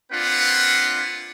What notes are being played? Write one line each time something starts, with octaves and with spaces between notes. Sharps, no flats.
A#3 C4 D4 F4 B4 F#5